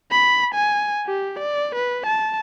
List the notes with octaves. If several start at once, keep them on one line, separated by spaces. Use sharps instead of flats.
B5
G#5
G4
D5
B4
A5